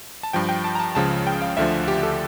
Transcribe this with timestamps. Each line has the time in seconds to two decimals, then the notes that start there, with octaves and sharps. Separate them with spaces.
0.23 A5
0.33 G2 F3 G5
0.49 G5
0.64 A5
0.75 A#5
0.80 A5
0.95 C#2 C#3 F3 A5
1.27 G5
1.42 F5
1.57 D2 D3 F3 E5
1.88 G4
2.03 A4